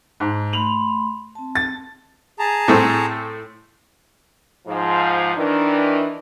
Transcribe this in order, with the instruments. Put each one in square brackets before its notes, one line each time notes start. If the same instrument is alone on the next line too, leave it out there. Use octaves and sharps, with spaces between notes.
[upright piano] G#2 [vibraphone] A5
[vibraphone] A3 B5 C6 [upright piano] F7 F#7
[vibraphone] C4 A5
[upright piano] A6
[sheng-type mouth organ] G#4 A5 A#5
[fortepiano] A2 A3 C4
[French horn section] G#2 F3
D#3 E3 D4